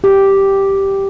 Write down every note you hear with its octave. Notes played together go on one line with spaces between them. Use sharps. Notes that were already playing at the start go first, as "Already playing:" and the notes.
G4